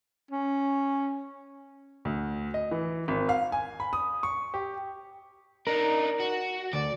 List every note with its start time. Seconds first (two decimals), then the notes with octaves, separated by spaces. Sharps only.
0.31 C#4
2.05 D2
2.54 D#5
2.71 E3
3.08 G#1
3.29 F5
3.52 G#5
3.80 B5
3.93 D#6
4.23 C#6
4.54 G4
5.67 D4 D#4 A#4
6.20 F#4
6.73 D2 D5